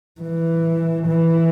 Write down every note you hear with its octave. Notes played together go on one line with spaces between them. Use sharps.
E3
E3